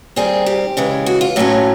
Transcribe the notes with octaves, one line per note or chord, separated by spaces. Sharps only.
D#3 G3 C4 G#4
G4
C#3 E3 G#3
F#4
F4
A2 F#3 A3 C#4